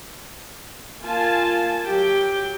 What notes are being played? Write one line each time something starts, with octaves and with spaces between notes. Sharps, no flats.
A#3 F4 G#5 A5
F#3 G4 G5